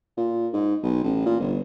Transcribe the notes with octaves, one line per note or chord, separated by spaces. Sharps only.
A#2
G#2
B1
A1
A#2
G1